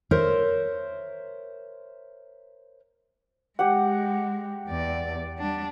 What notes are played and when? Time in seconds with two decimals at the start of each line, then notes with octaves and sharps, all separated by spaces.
0.11 A#4 C5 C#5 E5
3.59 G#3 G4 F#5
4.67 E2 D5
5.39 G3 D4